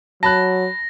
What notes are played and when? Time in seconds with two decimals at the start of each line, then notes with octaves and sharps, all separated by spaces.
0.23 F#3 A5 B5 F#6 A#6